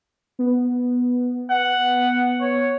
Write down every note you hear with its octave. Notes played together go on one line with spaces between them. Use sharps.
B3
F#5
C#5